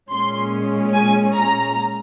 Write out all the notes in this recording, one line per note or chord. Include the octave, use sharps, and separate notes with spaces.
A#2 G#3 C#4 C6
G#5
A#5